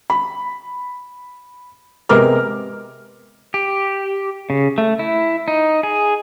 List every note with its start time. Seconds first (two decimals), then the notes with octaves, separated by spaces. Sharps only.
0.10 B5
2.09 C3 G#3 B3 A#4 D6 F6
3.54 G4
4.50 C#3
4.78 A3
4.99 E4
5.48 D#4
5.83 G#4